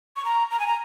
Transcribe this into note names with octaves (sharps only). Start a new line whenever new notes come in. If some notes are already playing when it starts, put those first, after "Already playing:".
C#6
A#5
A#5
G#5
A#5